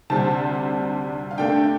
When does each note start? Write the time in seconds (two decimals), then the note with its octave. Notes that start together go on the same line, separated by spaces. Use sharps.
0.10 D2 C3 G3 C4 A5
1.31 F5
1.38 G2 D3 A3 D4 G5